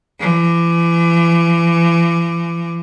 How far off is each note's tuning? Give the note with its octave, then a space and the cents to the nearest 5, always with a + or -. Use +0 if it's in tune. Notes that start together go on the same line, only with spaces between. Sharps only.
E3 +40